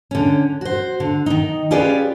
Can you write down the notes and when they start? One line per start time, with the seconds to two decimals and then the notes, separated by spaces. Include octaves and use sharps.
0.11 D3 C#4
0.61 F#4 C5
1.00 D3
1.26 D#3 D#4
1.71 C#4 F4 G4 G#4 B4 D5